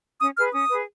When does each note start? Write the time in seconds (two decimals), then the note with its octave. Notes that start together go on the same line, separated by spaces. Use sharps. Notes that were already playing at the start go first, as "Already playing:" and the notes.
0.21 C#4 D#6
0.37 G#4 B4 F6
0.54 C#4 D#6
0.70 G#4 B4